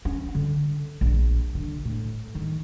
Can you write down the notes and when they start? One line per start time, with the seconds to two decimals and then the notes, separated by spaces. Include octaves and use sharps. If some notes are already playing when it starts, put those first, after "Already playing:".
0.05 C#4
0.35 D3
1.01 A#1
1.55 D3
1.85 A2
2.35 D#3